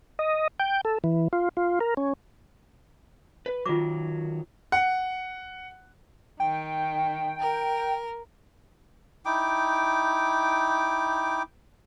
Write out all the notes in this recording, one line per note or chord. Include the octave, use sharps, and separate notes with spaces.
D#5
G5
A4
E3
F4
F4
A#4
C#4
B4
D#3 F#3 F4 D6
F#5
D#3 G5
A#4
D#4 E4 G5 D6